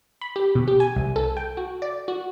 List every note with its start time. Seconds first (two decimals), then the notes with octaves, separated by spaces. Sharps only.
0.21 B5
0.36 G4
0.55 B2
0.68 G4
0.80 G#5
0.96 C2
1.16 A4
1.37 G5
1.57 F#4
1.82 D5
2.08 F#4